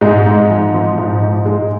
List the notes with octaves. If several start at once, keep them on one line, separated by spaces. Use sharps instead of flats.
G#2 G#3
G#2
F3
F3
G#2
G#2
G#2 G#3